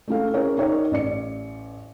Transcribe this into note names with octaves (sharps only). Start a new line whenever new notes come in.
A3 C#4 E4 A4 F5
C#4 G#4 A#4 C#5
D#4 A#4 C#5 D5
A1 D5 C#7